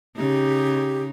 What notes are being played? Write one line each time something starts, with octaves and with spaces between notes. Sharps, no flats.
C#3 D#4 G4